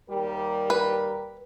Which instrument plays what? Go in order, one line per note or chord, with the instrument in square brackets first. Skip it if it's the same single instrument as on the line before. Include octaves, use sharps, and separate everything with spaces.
[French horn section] D#2 G3 G4 [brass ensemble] A#4
[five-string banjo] B4